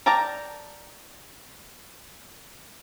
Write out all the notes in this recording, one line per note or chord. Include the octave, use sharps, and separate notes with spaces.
A#4 D5 G5 A5 A#5